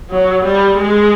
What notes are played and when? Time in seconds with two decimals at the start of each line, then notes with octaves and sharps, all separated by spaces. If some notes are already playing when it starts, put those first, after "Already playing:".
0.10 F#3
0.45 G3
0.78 G#3